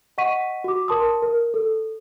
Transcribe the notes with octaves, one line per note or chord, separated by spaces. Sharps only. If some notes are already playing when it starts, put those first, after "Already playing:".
D#5 F#5 C#6 B6 D#7
F#4 D6
A#4 A5 C6 D#6
A#4
A4